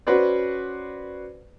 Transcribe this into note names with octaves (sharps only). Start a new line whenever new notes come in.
C#4 F#4 B4 C5 D5